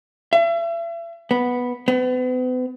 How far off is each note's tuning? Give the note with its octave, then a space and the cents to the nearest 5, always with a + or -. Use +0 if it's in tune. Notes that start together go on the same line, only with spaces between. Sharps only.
E5 +40
B3 -5
B3 +40